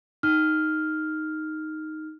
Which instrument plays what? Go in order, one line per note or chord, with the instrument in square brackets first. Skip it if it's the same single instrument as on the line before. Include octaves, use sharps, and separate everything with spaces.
[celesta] D#4 F6